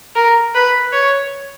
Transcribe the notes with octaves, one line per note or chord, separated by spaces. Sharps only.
A#4
B4
C#5